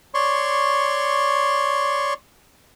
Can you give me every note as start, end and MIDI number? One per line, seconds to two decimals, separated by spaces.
0.14 2.14 73
0.14 2.14 74
0.14 2.14 84
0.14 2.14 85